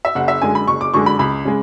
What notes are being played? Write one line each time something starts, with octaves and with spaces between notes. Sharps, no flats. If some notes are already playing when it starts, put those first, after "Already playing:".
E5
F#1 F#5
E5
F#2 D3 G#3 G#5
B5
F#1 C#6
D6
F#2 D3 G#3 C#6
B5
C#2 B5
C#3 G#3